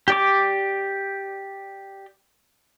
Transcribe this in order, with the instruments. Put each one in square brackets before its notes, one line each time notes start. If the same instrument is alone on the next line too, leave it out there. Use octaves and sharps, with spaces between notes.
[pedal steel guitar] G4 D5 D6